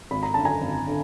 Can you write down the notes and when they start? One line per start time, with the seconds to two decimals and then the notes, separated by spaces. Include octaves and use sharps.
0.11 G#1 B5
0.23 A#5
0.34 F#2 D3 A5
0.45 G#5 A#5
0.61 G#1
0.87 D3